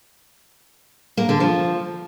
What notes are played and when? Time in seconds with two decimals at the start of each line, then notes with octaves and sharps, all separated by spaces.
1.17 A#3
1.29 D3
1.40 F3